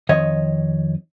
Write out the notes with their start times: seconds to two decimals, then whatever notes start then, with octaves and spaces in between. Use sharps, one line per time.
0.09 F2 D#3 C#5 D#5